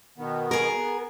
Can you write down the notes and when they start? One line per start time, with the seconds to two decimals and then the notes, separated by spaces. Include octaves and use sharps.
0.18 B2 D#3 B3
0.51 G#4 A#4
0.75 B3